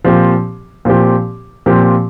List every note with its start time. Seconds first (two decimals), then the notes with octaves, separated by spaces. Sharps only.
0.04 A#2 F3 C4 G4
0.85 A#2 F3 C4 G4
1.66 A#2 F3 C4 G4